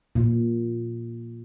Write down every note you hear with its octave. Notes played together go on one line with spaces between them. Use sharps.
A#2